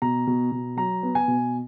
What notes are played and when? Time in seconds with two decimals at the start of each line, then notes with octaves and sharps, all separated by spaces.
0.02 B2 A#5
0.27 B2
0.52 B2
0.77 F#3 A#5
1.03 B3
1.15 G#5
1.28 B2